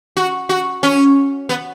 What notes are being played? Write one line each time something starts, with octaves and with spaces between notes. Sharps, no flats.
F#4
F#4
C#4
B3